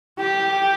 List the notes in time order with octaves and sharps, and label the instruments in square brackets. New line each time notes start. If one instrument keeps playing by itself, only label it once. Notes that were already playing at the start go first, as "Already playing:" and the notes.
[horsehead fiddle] G4